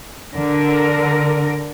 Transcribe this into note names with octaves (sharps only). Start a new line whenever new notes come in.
D3 A#4